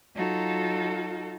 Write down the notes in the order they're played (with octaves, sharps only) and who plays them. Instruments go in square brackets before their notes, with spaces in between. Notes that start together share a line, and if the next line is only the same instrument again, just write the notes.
[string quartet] F#3 D#4 F4 F#4 A4